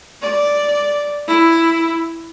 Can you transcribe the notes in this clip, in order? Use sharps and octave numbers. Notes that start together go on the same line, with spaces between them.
D5
E4